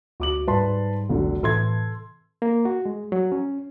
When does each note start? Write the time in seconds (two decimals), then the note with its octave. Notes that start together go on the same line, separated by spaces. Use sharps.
0.20 D2 F#4 D6 F#7
0.48 G#2 G3 B4 A5 C6
1.09 F1 C2 D3 F#3
1.43 A2 C3 E3 A4 C6 G#6
2.42 A#3
2.65 F#4
2.85 G#3
3.12 F#3
3.32 C#4